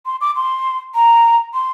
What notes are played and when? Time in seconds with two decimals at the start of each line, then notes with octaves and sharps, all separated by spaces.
0.06 C6
0.21 D6
0.36 C6
0.95 A#5
1.54 C6